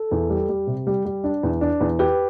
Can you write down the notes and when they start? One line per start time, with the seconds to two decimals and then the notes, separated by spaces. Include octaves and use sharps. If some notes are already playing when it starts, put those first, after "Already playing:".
Already playing: A4
0.11 E2
0.30 G3
0.49 G3
0.67 C3
0.87 G3
1.05 G3
1.24 D4
1.43 E2
1.61 D4
1.81 E2
1.99 G4 B4